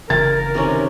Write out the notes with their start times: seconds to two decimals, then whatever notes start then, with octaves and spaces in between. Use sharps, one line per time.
0.10 F#1 C#3 E3 A#4 A6
0.54 C3 D#3 C#4